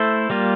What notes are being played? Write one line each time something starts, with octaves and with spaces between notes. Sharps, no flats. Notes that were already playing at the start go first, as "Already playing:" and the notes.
Already playing: A3 E4 A4 C5
G3 A#3 F4